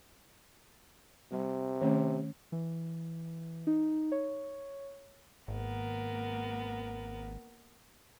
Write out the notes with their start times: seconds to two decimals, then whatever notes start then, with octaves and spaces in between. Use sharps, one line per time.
1.32 C3 G3
1.81 D#3 A3 C#4
2.52 E3
3.67 D#4
4.12 C#5
5.48 G#1 A#3 B3 A#4